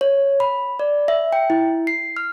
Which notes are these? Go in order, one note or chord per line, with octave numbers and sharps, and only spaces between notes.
C#5
B5
D5
E5
G5
E4
C7
F6